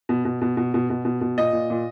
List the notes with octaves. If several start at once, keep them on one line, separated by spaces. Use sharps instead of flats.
B2
B2
B2
B2
B2
B2
B2
B2
A#2 D#5
A#2
A#2